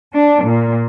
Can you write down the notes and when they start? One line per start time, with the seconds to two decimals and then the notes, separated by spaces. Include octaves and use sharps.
0.14 D4
0.45 A#2